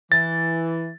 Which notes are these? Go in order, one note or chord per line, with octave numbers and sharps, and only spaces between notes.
E3 A6